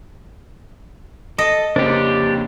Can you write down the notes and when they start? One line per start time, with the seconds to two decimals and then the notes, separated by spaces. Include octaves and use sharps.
1.38 A4 D#5
1.76 F2 C#3 A#3 D4 G4 A#4 C5 C#5